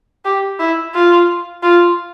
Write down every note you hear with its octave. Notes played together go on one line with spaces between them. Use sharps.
G4
E4
F4
F4